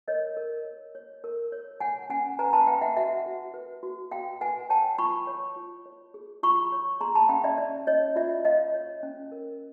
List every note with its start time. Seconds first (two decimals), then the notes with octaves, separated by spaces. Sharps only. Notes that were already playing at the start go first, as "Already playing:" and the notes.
0.08 A#4 C#5 D#5
0.37 A#4
0.65 C#5
0.95 C#5
1.24 A#4
1.52 C#5
1.80 C#5 F#5 G#5
2.10 C#4 F#5 G#5
2.39 B4 G#5 A#5
2.53 A5 B5
2.67 B4 F5 G5
2.82 E5 F#5
2.97 F#4 E5 F#5
3.26 F#4
3.54 B4
3.83 F#4
4.11 F#4 F5 G5
4.41 B4 F#5 G#5
4.69 C#5 G5 A5
4.98 F4 B5 C#6
5.27 C#5
5.56 F4
5.86 C#5
6.14 G#4
6.43 F4 B5 C#6
6.72 C#5
7.01 G#4 A#5 C6
7.15 A5 B5
7.29 C#4 F5 G5
7.44 D5 E5
7.58 C#4 D5
7.87 C#4 C#5 D#5
8.16 F4 D5 E5
8.45 C#5 D#5 F5
8.74 C#5
9.03 C#4
9.32 A#4